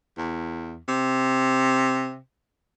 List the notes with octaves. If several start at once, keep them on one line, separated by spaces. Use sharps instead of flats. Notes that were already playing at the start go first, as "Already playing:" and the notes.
E2
C3